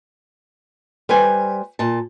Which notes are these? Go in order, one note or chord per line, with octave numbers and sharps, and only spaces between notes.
G3 B4 C5 G#5
A#2 A5